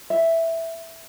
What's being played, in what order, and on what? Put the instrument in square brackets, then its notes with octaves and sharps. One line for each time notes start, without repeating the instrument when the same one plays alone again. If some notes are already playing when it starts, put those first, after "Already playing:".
[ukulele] E5